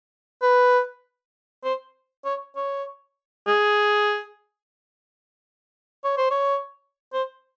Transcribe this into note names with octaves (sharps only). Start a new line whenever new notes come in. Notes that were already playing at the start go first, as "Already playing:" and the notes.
B4
C5
C#5
C#5
G#4
C#5
C5
C#5
C5